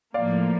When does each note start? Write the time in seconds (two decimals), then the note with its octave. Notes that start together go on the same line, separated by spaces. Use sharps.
0.14 A2 F3 A#3 D5 F5